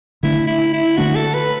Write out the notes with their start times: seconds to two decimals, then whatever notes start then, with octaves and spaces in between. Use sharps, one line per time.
0.23 D3 A3 D4 E4
0.47 E4
0.73 E4
0.97 D3 A3 D4 F#4
1.15 A4
1.34 B4